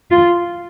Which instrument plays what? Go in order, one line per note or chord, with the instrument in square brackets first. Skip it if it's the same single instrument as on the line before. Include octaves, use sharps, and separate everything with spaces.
[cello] F4